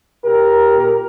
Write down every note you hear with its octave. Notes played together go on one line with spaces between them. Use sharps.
B2 G4 A#4
A#2